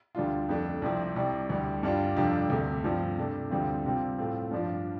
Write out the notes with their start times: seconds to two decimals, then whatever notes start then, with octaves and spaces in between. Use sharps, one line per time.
0.15 D2 D3 G3 D4 F4
0.49 F2 D3 A3 D4
0.82 C2 C3 F3 C4
1.16 C2 C3 G3
1.50 D2 D3 G3
1.83 G2 G3 D4 F4
2.16 F2 C3 G3 D4 F4
2.50 D2 C3 A3
2.84 G2 F3 C4 F4
3.18 C3 A3 D4
3.51 D2 D3 G3 C4 F4
3.85 C3 G3 C4 F4
4.18 A2 A3 C4 F4
4.51 G2 F3 D4 F4